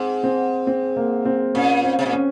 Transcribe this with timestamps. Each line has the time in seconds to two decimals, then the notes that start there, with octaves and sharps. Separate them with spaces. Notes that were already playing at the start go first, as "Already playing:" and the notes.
Already playing: G#2 C4
0.23 C4
0.67 C4
0.97 A#3
1.25 C4
1.55 A#2 C#4
1.84 C4
1.99 C3
2.06 A#2
2.13 C#4